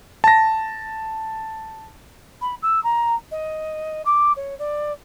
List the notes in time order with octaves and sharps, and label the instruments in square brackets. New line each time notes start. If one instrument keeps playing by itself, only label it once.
[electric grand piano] A5 A#6
[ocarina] B5
E6
A#5
D#5
D6
C#5
D5